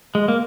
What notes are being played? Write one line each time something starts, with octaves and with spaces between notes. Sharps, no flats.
G#3
A#3